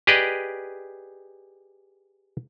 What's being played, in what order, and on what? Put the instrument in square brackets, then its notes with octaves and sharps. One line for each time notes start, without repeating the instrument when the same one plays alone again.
[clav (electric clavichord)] G4 G#4 B4 D5 D#5